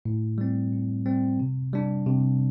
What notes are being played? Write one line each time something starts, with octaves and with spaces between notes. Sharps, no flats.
A2
G3 C4
A2
G3 C4
C3
G3 D4
C3